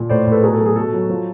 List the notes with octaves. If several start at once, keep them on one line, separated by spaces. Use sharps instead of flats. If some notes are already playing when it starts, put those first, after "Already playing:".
Already playing: A#2
A2 C5 D5
A2
A4 B4
B2 G#4 A#4
A4
F#3
G#4
B2 A4
F#3
F3